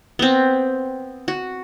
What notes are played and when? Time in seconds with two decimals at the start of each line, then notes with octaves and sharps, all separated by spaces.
0.19 B3 C4
1.28 F#4